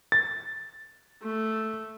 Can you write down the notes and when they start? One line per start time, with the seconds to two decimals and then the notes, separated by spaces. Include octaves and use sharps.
0.12 A6
1.23 A3